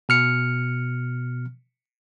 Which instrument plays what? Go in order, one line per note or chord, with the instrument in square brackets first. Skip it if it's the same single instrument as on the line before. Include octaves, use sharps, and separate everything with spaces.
[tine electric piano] B2 F6 C#7